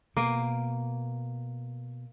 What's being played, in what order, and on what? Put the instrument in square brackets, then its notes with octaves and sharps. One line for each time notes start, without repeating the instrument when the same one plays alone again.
[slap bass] B2 [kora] A#3